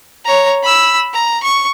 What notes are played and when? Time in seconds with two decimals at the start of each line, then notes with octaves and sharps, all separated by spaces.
0.25 C#5 A#5
0.62 B5 E6
1.13 A#5
1.43 C#6